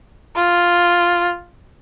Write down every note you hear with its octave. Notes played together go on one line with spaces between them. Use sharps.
F4